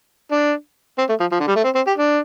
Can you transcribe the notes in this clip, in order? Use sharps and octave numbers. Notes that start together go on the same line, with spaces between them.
D4
C4
A3
F3
F3
D3
G3
A3
C4
C4
G4
D4